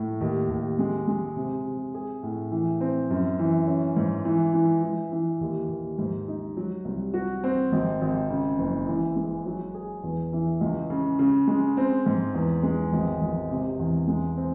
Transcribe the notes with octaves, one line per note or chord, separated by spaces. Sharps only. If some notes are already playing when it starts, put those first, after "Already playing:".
Already playing: A2
D#2
D#2
G#3
G#3
C3
C3
G#4
A2
E3
C4
F#2
E3
C#4
G#2
E3
E3
E3
E3
D#2
D#2
G#2
D#4
F#3
C2
F#4
C4
G#1
G#1
C#3
F#1
E3
G#3
F#3
G#4
E2
E3
C#2
C#3
C#3
G#3
C4
G#2
E2
G#3
G#1
G#1
C3
E2
G#3
C4